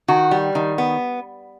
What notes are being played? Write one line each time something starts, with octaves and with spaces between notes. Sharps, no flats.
D#3 F#4
G3
D#3
B3